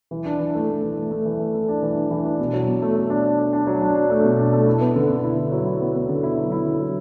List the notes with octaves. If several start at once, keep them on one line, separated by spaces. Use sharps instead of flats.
E3
D4
E3
A3
A3
E3
A3
A3
E3
A3
A3
D4
E3
D4
E3
D4
B2
F#3
B2
A3
A3
D4
D4
D4
D4
F#3
D4
D4
A3
B2
D4
A3
E4
B3
D3
D3
E4
E4
F#3
E4
B3
B3
D3
E4
F#3
E4
D3
F#3